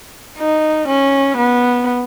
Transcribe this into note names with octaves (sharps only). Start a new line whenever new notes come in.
D#4
C#4
B3